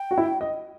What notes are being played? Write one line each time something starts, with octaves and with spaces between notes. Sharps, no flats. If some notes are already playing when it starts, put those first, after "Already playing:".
Already playing: G5
F#4
E4
D#5